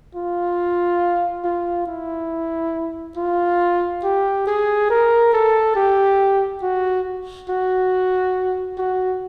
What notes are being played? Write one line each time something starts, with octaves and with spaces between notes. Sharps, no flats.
F4
F4
E4
F4
G4
G#4
A#4
A4
G4
F#4
F#4
F#4